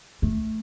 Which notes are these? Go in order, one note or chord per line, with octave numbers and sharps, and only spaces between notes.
A3